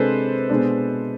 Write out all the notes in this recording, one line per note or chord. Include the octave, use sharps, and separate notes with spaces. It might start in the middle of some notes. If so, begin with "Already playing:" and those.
Already playing: C3 G#3 D4 A4 B4 C5
B2 G#3 D4